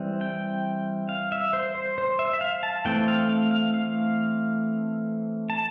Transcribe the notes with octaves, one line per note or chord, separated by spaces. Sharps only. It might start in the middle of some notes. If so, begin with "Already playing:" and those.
Already playing: E3 G3 C4
G5
F5
E5
C5
C5
C5
E5
E5
F5
A5
E3 A3 C4 G5
F5
F5
F5
F5
A5